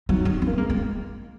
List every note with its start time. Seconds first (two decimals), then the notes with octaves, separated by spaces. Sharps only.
0.09 F#3 D#4
0.25 D#4
0.42 C#4
0.47 A#3
0.58 G#3 A#3
0.70 A#3